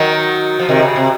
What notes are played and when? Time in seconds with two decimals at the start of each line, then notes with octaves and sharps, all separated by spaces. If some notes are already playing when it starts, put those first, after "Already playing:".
Already playing: D#3 F#3
0.59 F3
0.69 C3 D#3
0.82 C#3
0.96 C3